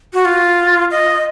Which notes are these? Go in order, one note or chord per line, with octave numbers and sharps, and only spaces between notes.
F#4
F4
D#5